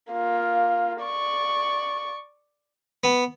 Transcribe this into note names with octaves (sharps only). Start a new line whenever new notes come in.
A#3 F4
D5 C#6
B3